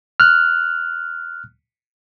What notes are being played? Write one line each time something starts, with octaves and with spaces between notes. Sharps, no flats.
F6 F#6